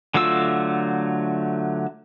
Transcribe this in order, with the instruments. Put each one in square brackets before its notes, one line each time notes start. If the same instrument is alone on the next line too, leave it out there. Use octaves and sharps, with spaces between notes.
[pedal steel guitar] D3 F#3 A3 F4 E6